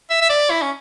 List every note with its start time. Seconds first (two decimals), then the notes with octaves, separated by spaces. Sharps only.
0.10 E5
0.22 E5
0.30 D5
0.50 E4
0.62 C#4